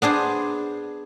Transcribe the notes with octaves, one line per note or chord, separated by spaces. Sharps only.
B3 D4 G#4 C5